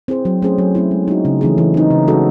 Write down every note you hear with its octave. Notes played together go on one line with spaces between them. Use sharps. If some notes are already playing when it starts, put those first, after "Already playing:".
C4 E4 G#4 C5
F#3
A3 C#4 G#4 C5
F#3
A3 C4 E4
G#3
D#4 F#4
C#3
E3 A3 C#4 G#4
E3
C4 D#4
C#3
G#3 C#4 F#4 A4